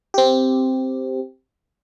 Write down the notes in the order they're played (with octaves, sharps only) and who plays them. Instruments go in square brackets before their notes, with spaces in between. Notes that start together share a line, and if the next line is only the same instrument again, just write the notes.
[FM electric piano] C4 G4